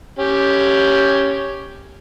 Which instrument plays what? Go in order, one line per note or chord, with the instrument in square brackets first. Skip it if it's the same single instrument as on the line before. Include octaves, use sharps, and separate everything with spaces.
[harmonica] C#4 G4